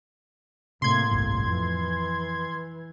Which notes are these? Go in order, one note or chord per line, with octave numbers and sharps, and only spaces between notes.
A2 C3 A#3 C6 G#6
G1 C2 G2
F2 E3